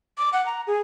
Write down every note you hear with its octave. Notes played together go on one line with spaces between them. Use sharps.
D6
F#5
A#5
G#4